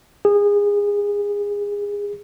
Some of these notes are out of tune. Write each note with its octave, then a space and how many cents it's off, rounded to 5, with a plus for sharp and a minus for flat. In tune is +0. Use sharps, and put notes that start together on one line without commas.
G#4 -25